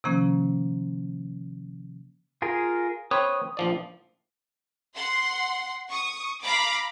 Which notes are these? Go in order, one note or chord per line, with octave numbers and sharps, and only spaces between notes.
C3 D#3 F3 A#3 C#4
F4 G#4 A#4
C4 B4 C#5 D#6
A#1 F3 D5
F#5 C6
C#6 D#6
F5 A#5 B5 D6